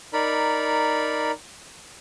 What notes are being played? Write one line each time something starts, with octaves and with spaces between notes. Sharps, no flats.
D#4 A#4 D5 B5